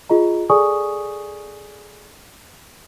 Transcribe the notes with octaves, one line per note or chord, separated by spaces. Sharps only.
F4 G#4 D#5 A#5
G#4 A4 D5 G#5 C#6 D#6